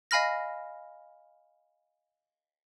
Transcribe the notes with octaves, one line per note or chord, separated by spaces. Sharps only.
D#5 F5 G#5 B5 F6 A#6